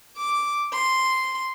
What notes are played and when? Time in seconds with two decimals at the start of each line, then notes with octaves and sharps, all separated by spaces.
0.18 D6
0.73 C6